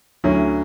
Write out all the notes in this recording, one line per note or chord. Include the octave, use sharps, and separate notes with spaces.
D2 D3 F#3 C#4 E4